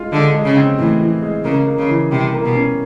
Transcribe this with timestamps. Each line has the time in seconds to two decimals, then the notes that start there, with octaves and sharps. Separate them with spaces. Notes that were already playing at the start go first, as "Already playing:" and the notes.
Already playing: G#3 F4
0.12 D3 G#3
0.35 G#3
0.45 C#3
0.56 C4
0.79 A2 E3
1.01 E3
1.22 G#3
1.44 C#3 A#3
1.67 A#3
1.78 C#3
1.89 E3
2.11 C3 G3
2.34 A#3
2.44 B2
2.55 C#4